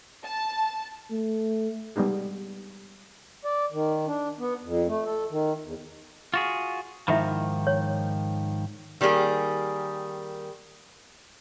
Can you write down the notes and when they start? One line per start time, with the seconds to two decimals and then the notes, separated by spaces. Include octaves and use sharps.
0.24 A5
1.11 A3
1.96 G3 G#3 B3 D#4 G#4
3.45 D5
3.72 D#3
4.07 D4
4.39 B3
4.63 F2
4.88 A3
5.05 A4
5.31 D#3
5.64 E2
6.34 F4 F#4 G#4
7.08 G#2 D#3 F3 E4 E5 B5
7.67 C#5
9.01 D#3 G3 A#3 G#4